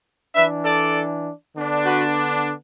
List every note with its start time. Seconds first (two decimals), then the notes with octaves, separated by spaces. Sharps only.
0.34 E3 D4 B4 E5
0.65 A4 D5
1.55 D3 B3 D4
1.85 F#4 B4